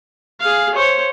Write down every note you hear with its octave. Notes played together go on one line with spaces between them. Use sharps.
G#4 F5
C5 C#5